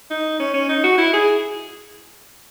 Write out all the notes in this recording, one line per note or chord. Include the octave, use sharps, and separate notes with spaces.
D#4
C#4
C#4
D#4
F#4
E4
G#4